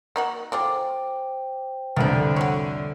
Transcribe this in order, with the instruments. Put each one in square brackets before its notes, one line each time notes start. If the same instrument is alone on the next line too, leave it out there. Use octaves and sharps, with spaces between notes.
[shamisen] A#3 D#4 F#4
[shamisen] A3 F4 G#4 [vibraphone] C5 G5 [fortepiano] D6
[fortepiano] C2 F2 [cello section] D3 [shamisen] B3 D5
[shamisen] F#4 C#5